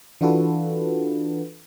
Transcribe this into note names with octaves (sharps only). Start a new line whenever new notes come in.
E3 D4 F4 F#4 A4 B4